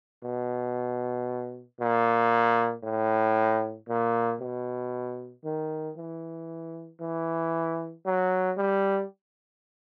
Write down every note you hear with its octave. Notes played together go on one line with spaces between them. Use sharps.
B2
A#2
A2
A#2
B2
D#3
E3
E3
F#3
G3